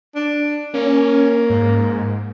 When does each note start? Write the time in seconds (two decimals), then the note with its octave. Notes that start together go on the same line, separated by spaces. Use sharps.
0.15 D4
0.74 A#3 C#4
1.50 G#2